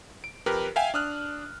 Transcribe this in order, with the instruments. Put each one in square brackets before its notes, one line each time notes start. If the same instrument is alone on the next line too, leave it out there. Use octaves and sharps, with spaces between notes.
[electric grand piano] D7
F2 G4 A#4 B4
E5 F5 G5 G#5
D4 D#6 F6 F#6